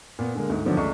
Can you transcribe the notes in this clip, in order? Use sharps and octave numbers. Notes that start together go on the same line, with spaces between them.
A#2 B3
D3 G#3 A#3
D2 G#2
D3 D#3 F3 F#3 B3 D4
C#2 A3 D5 C#6